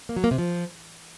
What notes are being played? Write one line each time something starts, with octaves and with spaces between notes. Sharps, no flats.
A#3
F#3
A#3
C3
F3